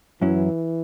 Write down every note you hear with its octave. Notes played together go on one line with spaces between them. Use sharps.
F#2 E3 F#3 C#4 E4